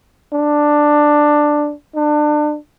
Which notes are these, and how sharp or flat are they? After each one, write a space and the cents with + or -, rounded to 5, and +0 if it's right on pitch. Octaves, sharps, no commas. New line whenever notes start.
D4 +10
D4 +30